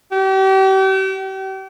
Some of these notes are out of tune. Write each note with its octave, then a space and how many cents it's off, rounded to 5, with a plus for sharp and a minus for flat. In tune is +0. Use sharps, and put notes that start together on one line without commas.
G4 -40